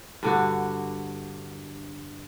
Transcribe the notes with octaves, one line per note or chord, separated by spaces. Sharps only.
G2 D3 F#4